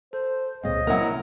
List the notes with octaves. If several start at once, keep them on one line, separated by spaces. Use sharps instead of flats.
A4 C5
C#2 A#2 G#3 C4 C#5 D#5 F5
C3 F#3 A#3 C4 C#4 E4 A#4